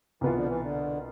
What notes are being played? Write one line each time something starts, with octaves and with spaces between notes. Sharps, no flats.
C2 B2 E3 B3 F4
D3 F3
E3
D3